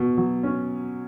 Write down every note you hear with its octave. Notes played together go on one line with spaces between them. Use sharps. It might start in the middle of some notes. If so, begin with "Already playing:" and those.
Already playing: B2
F#3
C#4